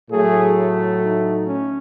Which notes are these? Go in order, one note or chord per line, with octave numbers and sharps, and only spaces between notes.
A2 F#3 A3 G#4
D#4
C#4